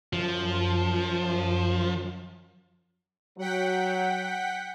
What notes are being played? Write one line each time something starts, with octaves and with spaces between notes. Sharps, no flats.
F#2 F3
F#3 F#5 G5 B6